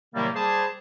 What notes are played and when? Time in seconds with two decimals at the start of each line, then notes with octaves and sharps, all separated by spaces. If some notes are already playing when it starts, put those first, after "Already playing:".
0.15 A2 C3 D#3 F#3 G3 A#3
0.34 G3 G#4 C5 A5